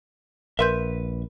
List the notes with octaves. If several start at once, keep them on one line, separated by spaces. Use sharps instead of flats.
A#1 A#4 B4 E5 C6 G6